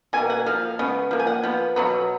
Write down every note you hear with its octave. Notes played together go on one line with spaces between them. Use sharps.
B2 A#3 G#5
F#5
F3 A#3 F5
C#3 G#3 B3
F3 A#3
G#5
F#5
F3 B3
B2 F#3 B3